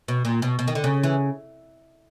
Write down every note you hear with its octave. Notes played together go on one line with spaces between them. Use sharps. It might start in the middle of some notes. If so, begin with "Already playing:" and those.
B2
A#2
B2
B2
D#3
D3
C#3
E3